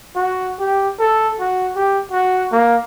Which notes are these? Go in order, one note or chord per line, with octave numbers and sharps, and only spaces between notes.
F#4
G4
A4
F#4
G4
F#4
A#3